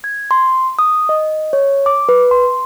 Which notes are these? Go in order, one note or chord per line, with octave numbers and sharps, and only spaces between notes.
G#6
C6
D#6
D#5
C#5
D6
B4
C6